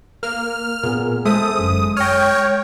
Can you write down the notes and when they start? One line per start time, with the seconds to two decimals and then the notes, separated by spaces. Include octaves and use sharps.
0.23 A#3 F6
0.83 A#2 B3 G#4 A#4
1.25 G#3 A4 C5 E5 D#6
1.59 G1 F#2
1.97 C#5 G5 F6 A#6